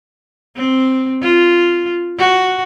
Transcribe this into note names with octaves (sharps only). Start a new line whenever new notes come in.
C4
F4
F#4